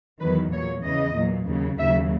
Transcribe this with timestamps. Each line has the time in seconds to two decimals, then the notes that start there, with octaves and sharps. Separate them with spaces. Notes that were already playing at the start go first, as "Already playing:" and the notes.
0.20 E2 D#3 F#3 B4
0.52 A#2 F#3 C#5
0.83 E2 C#3 E3 D#5
1.15 A#2 F#3
1.46 D#2 C#3 F#3
1.78 D#2 C#3 F#3 E5